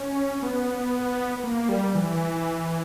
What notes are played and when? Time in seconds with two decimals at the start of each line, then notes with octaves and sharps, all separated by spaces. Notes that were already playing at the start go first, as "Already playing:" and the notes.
Already playing: C#4
0.43 B3
1.44 A#3
1.69 G3
1.95 E3